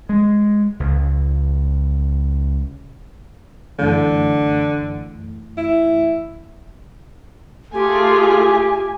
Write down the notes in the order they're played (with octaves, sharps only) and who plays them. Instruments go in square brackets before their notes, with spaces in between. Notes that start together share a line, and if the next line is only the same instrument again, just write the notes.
[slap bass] G#3
C#2
[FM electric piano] F#2 E3 A3 [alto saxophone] D3
[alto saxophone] E4
[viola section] A3 F4 G#4 [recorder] G4 [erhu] G#5